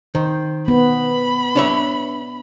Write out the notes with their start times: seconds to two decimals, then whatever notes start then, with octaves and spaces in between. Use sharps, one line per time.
0.15 D#3 C5
0.68 B3 B5
1.56 D4 C#5 E5